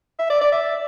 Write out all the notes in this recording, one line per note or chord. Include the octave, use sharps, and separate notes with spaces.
E5
D5
D5
E5